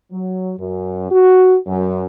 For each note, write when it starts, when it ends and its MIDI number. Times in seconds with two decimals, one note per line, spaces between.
0.12 0.53 54
0.59 1.06 42
1.11 1.55 66
1.67 2.06 42